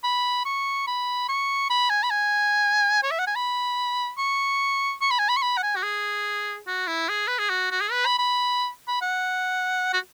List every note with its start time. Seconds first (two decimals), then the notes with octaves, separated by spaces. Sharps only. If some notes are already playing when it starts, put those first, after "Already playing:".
0.04 B5
0.45 C#6
0.87 B5
1.29 C#6
1.70 B5
1.90 G#5
2.03 B5
2.11 G#5
3.03 C#5
3.11 E5
3.19 F#5
3.27 G#5
3.36 B5
4.18 C#6
5.02 C#6
5.11 B5
5.19 G#5
5.29 B5
5.37 C#6
5.42 B5
5.57 F#5
5.63 G#5
5.76 F#4
5.83 G#4
6.68 F#4
6.87 E4
7.09 G#4
7.28 B4
7.39 G#4
7.50 F#4
7.71 F#4
7.81 G#4
7.92 B4
8.06 B5
8.19 B5
8.88 B5
9.02 F#5
9.93 F#4